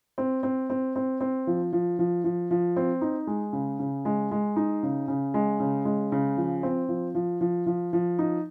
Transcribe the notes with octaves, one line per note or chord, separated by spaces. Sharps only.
C4
C4
C4
C4
C4
F3
F3
F3
F3
F3
C4
D#4
G#3
C#3
C#3
G#3
G#3
D#4
C#3
C#3
G#3
C#3
G#3
C#3
F3
C4
F3
F3
F3
F3
F3
D#4